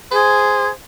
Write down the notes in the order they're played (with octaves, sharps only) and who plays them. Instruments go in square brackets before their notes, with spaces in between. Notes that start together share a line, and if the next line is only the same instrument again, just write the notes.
[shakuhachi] G#4 [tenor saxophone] C5